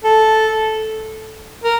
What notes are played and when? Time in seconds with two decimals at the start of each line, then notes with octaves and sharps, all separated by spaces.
0.04 A4
1.64 A#4